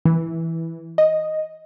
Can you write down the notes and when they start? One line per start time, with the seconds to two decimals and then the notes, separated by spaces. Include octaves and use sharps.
0.05 E3
0.98 D#5